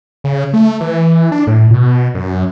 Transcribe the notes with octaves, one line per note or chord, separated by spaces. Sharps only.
C#3
A3
E3
D4
A2
B2
F#2